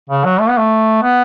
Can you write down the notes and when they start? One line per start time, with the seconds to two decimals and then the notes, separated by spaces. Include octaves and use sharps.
0.10 C#3
0.25 F#3
0.40 A3
0.49 B3
0.57 A3
1.03 B3